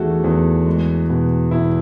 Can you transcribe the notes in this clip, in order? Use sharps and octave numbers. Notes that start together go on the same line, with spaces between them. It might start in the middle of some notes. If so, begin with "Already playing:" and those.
Already playing: E2 D#3 A3 F#4 G#4 A4
E2
G#3
B2
B2 E4